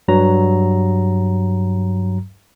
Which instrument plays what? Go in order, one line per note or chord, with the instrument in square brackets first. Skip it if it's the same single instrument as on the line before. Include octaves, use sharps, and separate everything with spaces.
[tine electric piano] G2 F#3 A#5